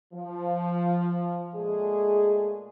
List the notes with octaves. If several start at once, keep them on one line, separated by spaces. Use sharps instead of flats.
F3
A#2 G#3 A3 G#4